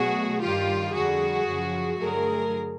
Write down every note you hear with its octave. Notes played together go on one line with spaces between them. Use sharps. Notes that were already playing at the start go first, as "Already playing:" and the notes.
Already playing: B2 F#3 A3 F#4 G#4
G2 D#3 G3 F4 G4
F2 D3 G3 F#4 G#4
F#2 C#3 F3
G2 D3 F#3 A3 G#4 A#4